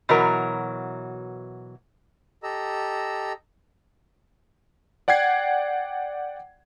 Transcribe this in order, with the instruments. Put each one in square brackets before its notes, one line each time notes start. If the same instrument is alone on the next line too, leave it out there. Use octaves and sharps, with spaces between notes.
[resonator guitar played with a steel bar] B2 E3 F#3 A#4 A#5
[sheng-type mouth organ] G4 A4 D#5 A#5 E6
[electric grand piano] D5 F#5 G5 G#6 C7